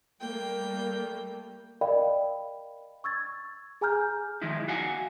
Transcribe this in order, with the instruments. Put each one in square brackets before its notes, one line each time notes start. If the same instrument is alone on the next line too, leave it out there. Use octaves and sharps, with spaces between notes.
[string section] G3 A3 A#3 [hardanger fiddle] G5
[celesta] A#4 D5 D#5 F5 G5 B5
C#6 E6 G#6 A6
G#4 G#5 A#5 F6 G6
[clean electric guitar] D#3 F3 G#3 D#4 E4
F#4 F5 F#5 G#5